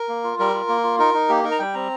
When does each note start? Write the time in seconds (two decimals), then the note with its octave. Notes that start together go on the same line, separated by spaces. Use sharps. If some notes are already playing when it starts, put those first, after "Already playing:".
Already playing: A#4
0.09 A#3
0.24 F4
0.39 G3 A#4
0.54 F4
0.69 A#3
0.84 F4
0.99 D#4 A#4
1.14 D#4
1.29 A#3 G4
1.44 D#4 A#4
1.51 A#5
1.59 G3 G5
1.74 C4 A#5